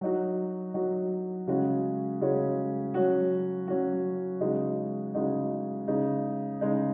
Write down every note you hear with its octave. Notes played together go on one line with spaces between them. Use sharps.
F#3 D#4 F#4
F#3 D#4 F#4
C#3 G#3 C#4 F#4
C#3 G#3 C#4 F#4
F#3 C#4 F#4
F#3 C#4 F#4
C#3 G#3 D#4 F#4
C#3 G#3 D#4 F#4
C#3 G#3 D#4
C#3 G#3 D#4